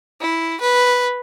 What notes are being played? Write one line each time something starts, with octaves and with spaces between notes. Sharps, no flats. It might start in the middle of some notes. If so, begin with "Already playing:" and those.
E4
B4